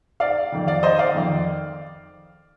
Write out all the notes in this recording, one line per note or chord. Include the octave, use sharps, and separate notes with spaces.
D5 F5
F2 D#3
D5 F5
C5 D#5
D5 F5
F2 D#3